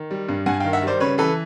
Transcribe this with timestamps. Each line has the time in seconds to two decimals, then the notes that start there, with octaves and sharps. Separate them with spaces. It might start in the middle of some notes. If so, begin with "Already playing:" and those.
Already playing: D#3
0.11 G3
0.29 G2
0.46 G2 F#5 G#5
0.60 D#3 F5 G5
0.73 E5 F#5
0.83 G3 C5 D5
1.00 C#3 B4 C#5
1.18 E3 A4 B4